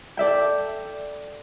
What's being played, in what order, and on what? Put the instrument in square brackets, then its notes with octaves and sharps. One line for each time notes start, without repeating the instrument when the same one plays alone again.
[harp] A4 D5 E5 G5